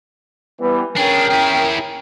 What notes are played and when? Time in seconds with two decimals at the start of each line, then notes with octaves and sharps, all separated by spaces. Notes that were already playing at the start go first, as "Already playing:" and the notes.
0.60 E3 G3 B3
0.96 C#4 D4 G#4 A#4 G5
1.30 E4 G#4